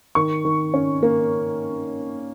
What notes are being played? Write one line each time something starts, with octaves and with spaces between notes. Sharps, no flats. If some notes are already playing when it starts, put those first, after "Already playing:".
D#3 C#6
D#3
C#4
A#3